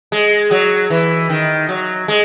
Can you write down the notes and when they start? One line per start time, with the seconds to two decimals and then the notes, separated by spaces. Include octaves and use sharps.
0.12 G#3
0.51 F#3
0.90 E3
1.30 D#3
1.69 F#3
2.08 G#3